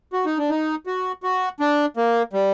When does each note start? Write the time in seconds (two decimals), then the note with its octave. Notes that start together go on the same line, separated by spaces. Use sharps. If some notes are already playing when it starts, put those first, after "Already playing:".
0.13 F#4
0.26 D#4
0.38 D4
0.50 D#4
0.86 F#4
1.23 F#4
1.60 D4
1.97 A#3
2.33 G3